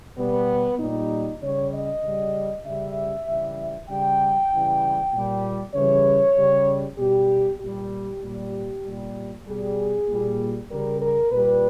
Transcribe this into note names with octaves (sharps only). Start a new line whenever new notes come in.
B2 G3 B3
A#2 G3 D#4
C#3 G3 C#5
D#5
C#3 G3
C#3 G3 E5
C#3 E3 G3
C#3 G3 G5
C#3 E3 G3
A#2 G3
C#3 E3 G3 C#5
C#3 G3
B2 G3 G4
A#2 G3 G4
A#2 G3
A#2 G3
B2 G3 G#4
A#2 G3
C#3 G3 A#4
A#4
A#2 G3 B4